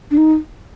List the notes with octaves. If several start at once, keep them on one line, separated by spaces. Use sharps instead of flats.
D4
D#4